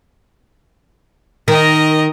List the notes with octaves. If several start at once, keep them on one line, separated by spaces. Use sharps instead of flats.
D#3 A#4 D#5